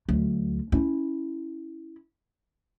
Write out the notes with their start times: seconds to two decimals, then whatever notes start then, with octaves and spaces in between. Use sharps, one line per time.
0.09 D2 F#3
0.72 C#4 E4